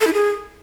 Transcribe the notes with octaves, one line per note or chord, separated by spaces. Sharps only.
A4
E4
G#4